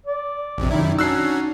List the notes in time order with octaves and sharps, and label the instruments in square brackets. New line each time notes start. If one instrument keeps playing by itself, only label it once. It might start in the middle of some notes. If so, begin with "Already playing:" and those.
[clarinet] D5
[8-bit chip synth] A#1 F2 C3
[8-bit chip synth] F#2 D#3 E4 [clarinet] D#4
[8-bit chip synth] C#4 D4 F#4 [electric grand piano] E6 F#6 C7